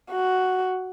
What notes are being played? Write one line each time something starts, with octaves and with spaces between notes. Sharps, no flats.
F#4